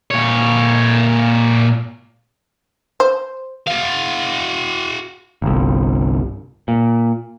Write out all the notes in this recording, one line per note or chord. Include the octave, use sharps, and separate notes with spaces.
A#2 C#5
C5
F#4 F5
G1 C2
A#2